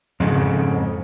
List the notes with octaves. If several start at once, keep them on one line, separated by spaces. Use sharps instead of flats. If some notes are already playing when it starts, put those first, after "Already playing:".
F2 G#2 C#3